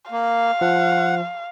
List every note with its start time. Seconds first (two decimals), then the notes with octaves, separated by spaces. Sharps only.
0.11 A#3 F5
0.61 F3 F#5